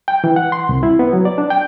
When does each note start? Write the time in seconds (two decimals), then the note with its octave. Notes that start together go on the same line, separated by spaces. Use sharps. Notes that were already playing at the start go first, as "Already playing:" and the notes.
0.08 G5
0.24 E3
0.36 F#5
0.52 C6
0.69 C2
0.83 E4
0.99 B3
1.13 F#3
1.25 D5
1.38 D4
1.50 G5